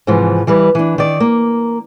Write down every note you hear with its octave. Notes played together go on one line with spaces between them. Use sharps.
G#2 C3 E3 F3
E3 G3 B4
E3 D4
D#3 D5
A#3